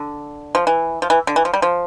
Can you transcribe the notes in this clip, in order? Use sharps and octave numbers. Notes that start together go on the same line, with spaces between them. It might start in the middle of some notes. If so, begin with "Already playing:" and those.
Already playing: D3
F3
E3
F3
E3
D3
E3
F3
G3
F3